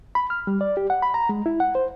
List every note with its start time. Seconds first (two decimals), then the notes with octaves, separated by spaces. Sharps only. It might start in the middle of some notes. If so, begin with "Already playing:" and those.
0.15 B5
0.30 F6
0.47 G3
0.61 D5
0.77 G4
0.90 F#5
1.02 B5
1.14 A#5
1.29 G#3
1.46 E4
1.60 F#5
1.75 C5